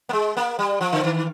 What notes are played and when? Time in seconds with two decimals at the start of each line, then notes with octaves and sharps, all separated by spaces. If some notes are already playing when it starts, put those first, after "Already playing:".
0.09 A#3
0.13 G#3
0.37 A#3
0.59 G3
0.81 F3
0.92 D3
1.04 D#3